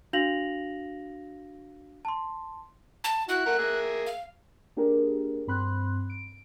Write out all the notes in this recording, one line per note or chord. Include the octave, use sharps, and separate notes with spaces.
D4 F#4 F5 A#6 F7 F#7
A5 C6
A5
E4 F#4 F#6
A3 A#4 F#5
A#3 G#4 E5
F5
A#3 D4 G4 G#4 A#4
G2 C4 B5 C6 F#6
D7